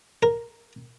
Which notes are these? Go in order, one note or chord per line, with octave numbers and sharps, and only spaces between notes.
A#4